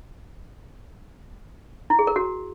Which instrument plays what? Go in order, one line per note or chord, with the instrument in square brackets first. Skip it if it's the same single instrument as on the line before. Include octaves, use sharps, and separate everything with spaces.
[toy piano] E4
G#4
A#4
F#4